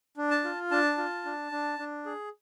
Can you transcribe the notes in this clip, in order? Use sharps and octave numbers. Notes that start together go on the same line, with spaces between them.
D4
A5
F4
D4 A5
F4
D4
D4
D4
G#4